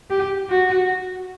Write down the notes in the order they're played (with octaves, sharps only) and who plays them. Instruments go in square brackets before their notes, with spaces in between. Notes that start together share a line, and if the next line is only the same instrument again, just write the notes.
[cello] G4
F#4